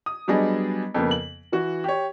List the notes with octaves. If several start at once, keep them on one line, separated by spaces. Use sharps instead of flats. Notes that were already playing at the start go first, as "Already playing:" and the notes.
D#6
F#3 G3 B3 D4 G#4 D#5
F2 C#3 A#3 B3
F#7
E3 F#4
G4 C#5